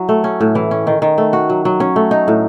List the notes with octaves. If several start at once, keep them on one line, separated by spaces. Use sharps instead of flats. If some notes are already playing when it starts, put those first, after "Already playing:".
Already playing: F#3 E4
A3
C#4
A2
E3
C#4
D#3
D#3
A3
F#4
F#3
F#3
C#4
A3
D#4
A2